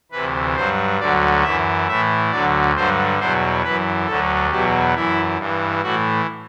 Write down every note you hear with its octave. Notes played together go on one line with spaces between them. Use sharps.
D2 C3 E3 B4
G2 F#3 C5
D2 D3 F#3 D5
F#2 E3 E5
A2 E3 E5
D2 D3 F#3 D5
G2 D3 F#3 C5
E2 B2 F#3 C5
F#2 E3 B4
D2 D3 F#3 A4
E2 B2 F#3 G4
F#2 E3 E4
G2 E3
A2 E3 F#4